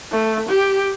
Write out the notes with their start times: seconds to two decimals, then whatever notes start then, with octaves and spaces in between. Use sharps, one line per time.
0.11 A3
0.49 G4